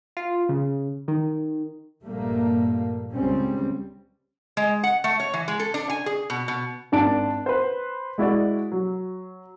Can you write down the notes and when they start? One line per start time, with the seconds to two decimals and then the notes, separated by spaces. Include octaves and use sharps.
0.17 F4
0.49 C#3
1.08 D#3
2.02 A#1 G2 A#2 G3 A3 A#3
3.12 C#2 G3 C4 C#4
4.57 G#3
4.83 F#5
5.04 A3
5.20 C#5
5.33 E3
5.48 G#3
5.60 A4
5.74 D4
5.89 G#5
6.06 G#4
6.30 B2
6.48 B2
6.92 G#1 D4 A5 D7
7.46 B4 C5
8.18 G#3 E4 F#4 D5
8.72 F#3